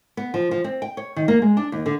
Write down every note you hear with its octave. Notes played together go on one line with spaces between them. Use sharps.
B3
F3
F3
C4
G5
C#5
D#3
A#3
G#3
D4
D#2
D3